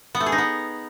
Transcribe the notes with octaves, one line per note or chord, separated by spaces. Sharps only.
B3
A3
G#4
D#4
B3